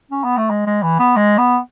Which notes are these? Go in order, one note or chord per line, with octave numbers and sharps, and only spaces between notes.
C#4
B3
A3
G#3
G#3
E3
B3
G#3
B3